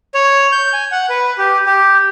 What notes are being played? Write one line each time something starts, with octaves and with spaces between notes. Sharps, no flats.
C#5
G6
G#5
F#5
B4
G4
G4